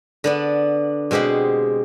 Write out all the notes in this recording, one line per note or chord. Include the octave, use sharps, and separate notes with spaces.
D3 B3 D4
B2 G#3 C4 G4 F#5